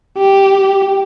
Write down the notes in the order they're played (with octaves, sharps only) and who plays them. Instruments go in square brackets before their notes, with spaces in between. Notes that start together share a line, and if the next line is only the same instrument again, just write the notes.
[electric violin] G4